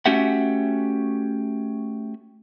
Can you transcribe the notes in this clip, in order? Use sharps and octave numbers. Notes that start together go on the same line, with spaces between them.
A3 C#4 F#4 G4 E5 F#5